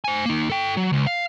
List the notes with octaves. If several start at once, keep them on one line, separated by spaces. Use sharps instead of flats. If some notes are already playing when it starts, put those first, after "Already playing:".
C5 G#5
A#3 D#4
A4 G5
F#3
C#2
F5